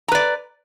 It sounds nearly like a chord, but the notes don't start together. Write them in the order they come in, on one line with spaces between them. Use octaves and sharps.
A#5 B4 D5